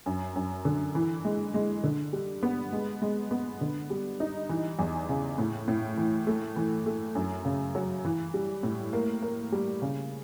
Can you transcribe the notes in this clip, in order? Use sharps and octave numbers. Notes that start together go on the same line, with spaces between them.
F#2
F#2
D3
E3
G#3
G#3
D3
G3
B3
G#3
G#3
B3
D3
G3
D#4
E3
E2
C#3
A2
A2
E3
A3
E3
A3
F#2
C#3
F#3
E3
G3
A2
A#3
A#3
G3
C#3